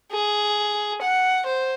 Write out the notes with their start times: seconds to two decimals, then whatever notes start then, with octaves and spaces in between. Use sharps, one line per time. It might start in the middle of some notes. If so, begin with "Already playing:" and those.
0.11 G#4
1.01 F#5
1.46 C5